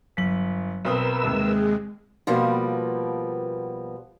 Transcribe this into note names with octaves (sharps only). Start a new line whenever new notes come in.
G1 F#3 B6 F#7
B1 C4 A#4 B4 D#6 E6
D#2 C3 G#3
B2 F3 G3 A#3 B3